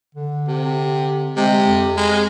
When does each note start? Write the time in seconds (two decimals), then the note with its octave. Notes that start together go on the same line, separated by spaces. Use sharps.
0.15 D3
0.47 C3
1.37 C3 G#3
1.66 F2
1.98 G#3